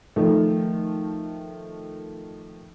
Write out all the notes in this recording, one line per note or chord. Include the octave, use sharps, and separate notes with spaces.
D#3 F3 A3